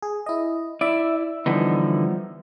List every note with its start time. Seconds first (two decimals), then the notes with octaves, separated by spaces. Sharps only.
0.02 G#4
0.26 E4 D#5
0.81 E4 D5 E5 E6
1.46 D3 E3 F3 G3 B3 D#4